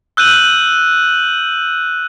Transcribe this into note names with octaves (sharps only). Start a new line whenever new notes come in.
E6 F#6 G6 D#7 F#7